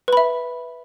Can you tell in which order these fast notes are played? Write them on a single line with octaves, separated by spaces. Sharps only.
B4 B5 E5